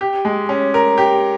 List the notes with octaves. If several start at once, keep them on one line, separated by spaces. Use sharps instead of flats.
G4
G#3
C#4
A#4
G4